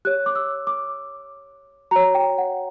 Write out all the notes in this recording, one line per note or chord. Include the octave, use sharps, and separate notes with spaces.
G4 C#5 F#6
D6
E6
D6
F#4 C#5 A#5
G5
F#5